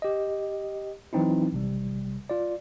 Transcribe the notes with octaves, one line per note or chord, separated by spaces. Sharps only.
G4 D#5
E3 F#3 C4 D#4 E4
A1 C3 G3
F4 D5